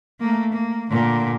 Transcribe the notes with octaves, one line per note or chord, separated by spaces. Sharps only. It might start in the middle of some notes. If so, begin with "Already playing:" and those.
A3 A#3
A#3
A#2 D3